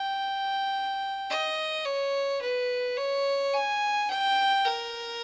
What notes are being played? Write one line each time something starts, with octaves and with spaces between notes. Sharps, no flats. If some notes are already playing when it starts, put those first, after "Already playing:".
Already playing: G5
D#5
C#5
B4
C#5
G#5
G5
A#4